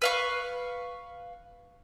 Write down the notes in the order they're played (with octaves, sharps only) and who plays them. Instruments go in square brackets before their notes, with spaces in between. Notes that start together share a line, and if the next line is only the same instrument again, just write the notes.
[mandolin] B4 F5 C#6